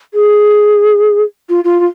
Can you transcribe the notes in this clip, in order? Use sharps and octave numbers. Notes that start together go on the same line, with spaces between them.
G#4
F4
F4
F4